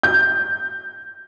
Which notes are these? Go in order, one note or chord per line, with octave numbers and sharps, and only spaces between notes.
G6